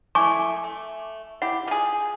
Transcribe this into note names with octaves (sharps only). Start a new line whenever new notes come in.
A3 E4 G#5 A5 C#6 D6
A3
E4 G4 F#5
F3 G#4